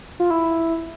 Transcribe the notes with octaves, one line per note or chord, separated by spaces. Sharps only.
F4
E4